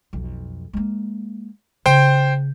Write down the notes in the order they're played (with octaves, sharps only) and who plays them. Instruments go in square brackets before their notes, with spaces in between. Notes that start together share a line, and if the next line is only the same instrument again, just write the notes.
[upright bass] B1 F2
G#3 A#3
[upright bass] C#3 [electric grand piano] C5 G5